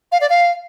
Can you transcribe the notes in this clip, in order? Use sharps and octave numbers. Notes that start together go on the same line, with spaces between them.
F5
D5
F5